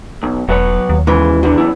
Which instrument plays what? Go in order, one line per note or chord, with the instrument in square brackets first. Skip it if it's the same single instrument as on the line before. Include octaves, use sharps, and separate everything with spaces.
[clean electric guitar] B1
[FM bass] E1 [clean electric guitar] F#3 B4 C#5
[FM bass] D#2
[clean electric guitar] G#2 C#3 G#3 [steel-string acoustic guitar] E3
[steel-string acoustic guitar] E2 [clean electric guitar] B2 D4
[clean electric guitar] F#2 E4